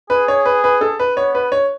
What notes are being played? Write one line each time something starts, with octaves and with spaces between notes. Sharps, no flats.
G#4 B4
C#5
B4
B4
A4
B4
B3 C#5
B4
C#5